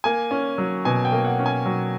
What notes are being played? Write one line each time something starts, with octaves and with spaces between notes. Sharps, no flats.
A#3 G#5
C#4
F#3
B2 G#5
G5
A#3
F#5
C#4
G#5
F#3